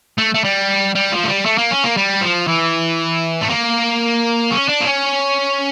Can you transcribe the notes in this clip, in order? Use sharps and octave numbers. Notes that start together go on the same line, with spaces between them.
A3
A3
G3
G3
F3
A3
G3
A3
A#3
C#4
A#3
G3
F3
E3
A3
A#3
C#4
D4
A#3
C#4